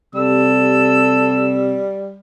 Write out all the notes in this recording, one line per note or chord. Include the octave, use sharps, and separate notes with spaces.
C3 G3 A4 E6